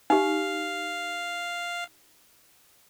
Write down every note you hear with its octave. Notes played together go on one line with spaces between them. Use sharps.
D#4 G4 F5